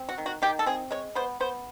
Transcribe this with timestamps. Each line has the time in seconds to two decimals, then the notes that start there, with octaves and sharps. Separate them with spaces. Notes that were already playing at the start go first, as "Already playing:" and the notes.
Already playing: C4
0.09 F#4
0.18 D#3
0.26 F#4
0.42 D#3 G4
0.59 A4
0.66 C4 G#4
0.91 G#3 C#5
1.15 B3 C5
1.40 B3 C5